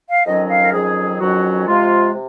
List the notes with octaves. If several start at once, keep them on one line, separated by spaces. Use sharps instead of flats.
F5
F2 D#3 F#3 C#4 D#5
D#5
F5
A#4
F2 D#3 F#3 C#4 G#4
F2 D#3 F#3 C#4 F#4
C3 F3 G#3 F4
C3